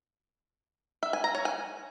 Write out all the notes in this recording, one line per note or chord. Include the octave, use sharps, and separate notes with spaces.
E5
G#5
A#5
C#5
G#5